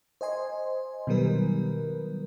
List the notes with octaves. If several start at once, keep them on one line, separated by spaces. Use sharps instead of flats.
C5 D#5 G#5 C6
B2 D#3 F#3 G3 A#4 B4